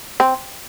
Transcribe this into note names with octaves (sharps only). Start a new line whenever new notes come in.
C4